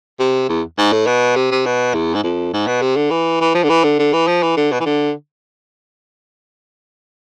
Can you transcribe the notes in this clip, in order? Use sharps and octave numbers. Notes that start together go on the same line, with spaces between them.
C3
E2
G#2
A2
B2
C3
C3
B2
E2
G#2
F2
G#2
B2
C3
D3
E3
E3
F3
D3
E3
D3
D3
E3
F3
E3
D3
B2
E3
D3